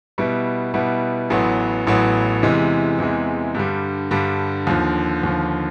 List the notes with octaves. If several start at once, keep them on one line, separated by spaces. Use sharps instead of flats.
B2 G3 B3 E4
B2 G3 B3 E4
A1 A2 F#3 B3
A1 A2 F#3 B3
E2 C3 E3 G#3
E2 C3 E3 G#3
G2 D3 G3
G2 D3 G3
D#2 D3 F3
D#2 D3 F3